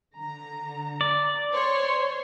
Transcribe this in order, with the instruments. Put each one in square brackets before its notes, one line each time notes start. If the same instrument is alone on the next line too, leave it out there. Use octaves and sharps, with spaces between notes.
[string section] D3 A#5
[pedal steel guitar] D5
[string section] C5 C#5 C6